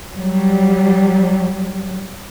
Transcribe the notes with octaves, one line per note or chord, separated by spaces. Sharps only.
F#3 G3